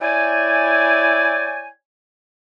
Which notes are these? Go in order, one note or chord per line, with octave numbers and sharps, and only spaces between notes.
E4 C#5 D5 G5 G#5